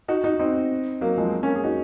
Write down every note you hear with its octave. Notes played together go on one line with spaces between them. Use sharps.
D#4 F#4
D#4 F#4
C4 D#4
F#3 A#3
F3 G#3
A#3 C#4
G#4
D#4 F#4